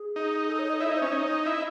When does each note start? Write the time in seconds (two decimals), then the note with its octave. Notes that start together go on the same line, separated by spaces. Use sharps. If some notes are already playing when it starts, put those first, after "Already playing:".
Already playing: G#4
0.16 D#4
0.49 A4
0.59 C#5
0.70 D#5
0.80 E4 E5
0.89 D#4 D#5
0.97 C5
1.02 C#4 C#5
1.12 D#4
1.29 D#5
1.46 E4